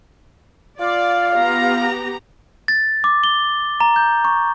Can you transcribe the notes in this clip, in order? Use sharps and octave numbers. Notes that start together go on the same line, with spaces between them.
F4 D5 F5
B3 G4 A#5
A6
D6
G7
A#5
G6
C#6